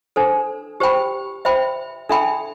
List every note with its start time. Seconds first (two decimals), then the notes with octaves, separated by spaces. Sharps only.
0.16 D4 A4 C5
0.80 G4 C5 G5 B5
1.45 C5 E5 G5 B5
2.09 D4 A4 E5 G5 B5